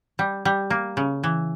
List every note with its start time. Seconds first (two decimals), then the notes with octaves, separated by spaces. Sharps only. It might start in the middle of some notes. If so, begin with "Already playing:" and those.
0.19 G3
0.45 G3
0.70 A#3
0.97 C#3
1.24 E3